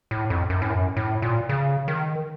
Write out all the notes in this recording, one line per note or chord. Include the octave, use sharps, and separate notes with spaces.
A2
F2
F#2
A2
F#2
A2
A#2
C#3
D#3